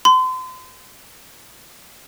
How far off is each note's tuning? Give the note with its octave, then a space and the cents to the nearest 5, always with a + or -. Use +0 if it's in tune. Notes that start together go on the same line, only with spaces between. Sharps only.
C6 -35